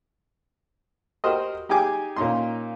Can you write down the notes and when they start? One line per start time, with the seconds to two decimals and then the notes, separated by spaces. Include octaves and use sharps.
1.24 F#4 G4 A#4 C5 D#5
1.69 D#4 G4 G#4 G#5 D6
2.16 A#2 C#4 D#4 C6